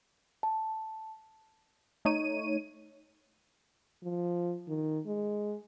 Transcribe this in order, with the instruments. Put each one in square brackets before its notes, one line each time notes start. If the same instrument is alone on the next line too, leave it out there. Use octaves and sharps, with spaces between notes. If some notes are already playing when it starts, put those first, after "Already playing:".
[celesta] A5
[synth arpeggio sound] A3 D#4 C#5 D#7
[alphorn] F3
D#3
G#3